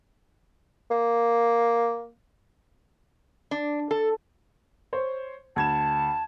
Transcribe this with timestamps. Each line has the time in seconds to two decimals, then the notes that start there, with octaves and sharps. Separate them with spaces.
0.91 A#3
3.51 D4
3.91 A4
4.93 C5 C#5
5.56 D2 A5 G#6 E7